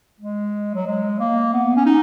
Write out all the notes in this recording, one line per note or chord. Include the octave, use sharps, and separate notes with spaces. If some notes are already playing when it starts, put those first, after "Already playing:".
G#3
F#3
G#3
A#3
B3
C#4
D#4